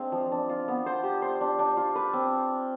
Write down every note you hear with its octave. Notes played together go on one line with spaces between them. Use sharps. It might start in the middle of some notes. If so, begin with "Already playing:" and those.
Already playing: G#3 C4 D4 F5
F3
D4
F4
B3
C5
G4
C5
D4
D4
F4
B4
C4